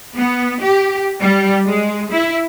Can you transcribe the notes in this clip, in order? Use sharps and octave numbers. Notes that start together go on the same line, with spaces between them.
B3
G4
G3
G#3
E4